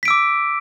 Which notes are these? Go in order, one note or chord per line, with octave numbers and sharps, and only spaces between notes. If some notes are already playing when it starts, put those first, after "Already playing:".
D6 E6 B6 D7